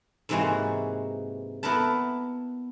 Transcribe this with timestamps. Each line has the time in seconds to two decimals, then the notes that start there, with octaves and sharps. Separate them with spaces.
0.29 G#2 C3 E3 G#3 A#3 F#4
1.63 B3 E4 A#4 B4 A5